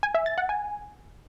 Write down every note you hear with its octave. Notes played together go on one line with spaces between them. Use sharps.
G#5
E5
A6
F#5
G#5